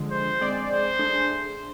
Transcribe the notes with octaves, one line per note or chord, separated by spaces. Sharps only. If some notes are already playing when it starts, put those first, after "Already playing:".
Already playing: D3 F3 G#3
C5
G#3 C4 G#4 D5
C5
A3 D4 G#4